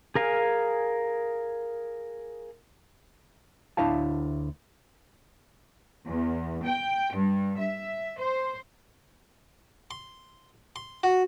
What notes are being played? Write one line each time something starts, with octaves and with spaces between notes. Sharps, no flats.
G#4 A#4 F5 G#5
D2 D4 E4 C#5 F5 A5
E2
G5
G2
E5
C5
C6
C6
F#4